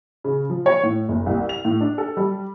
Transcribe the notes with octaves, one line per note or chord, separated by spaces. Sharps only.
C#3
F3
C#5
A2
F#1
C2
F7
A2
D4
A4
G3